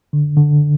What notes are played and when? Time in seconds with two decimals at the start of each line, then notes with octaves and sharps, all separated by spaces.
0.13 D3
0.37 D3